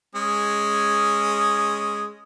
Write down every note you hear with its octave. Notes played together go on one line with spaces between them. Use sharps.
G#3 C#4 D#6